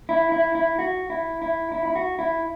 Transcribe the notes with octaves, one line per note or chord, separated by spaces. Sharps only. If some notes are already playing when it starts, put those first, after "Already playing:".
E4
E4
E4
F#4
E4
E4
E4
E4
F#4
E4